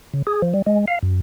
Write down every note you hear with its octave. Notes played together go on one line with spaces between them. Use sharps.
C#3
G#4
F3
G3
G#3
F5
F#2